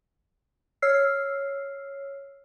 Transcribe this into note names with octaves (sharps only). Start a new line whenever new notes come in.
C#5 E6 F6 C7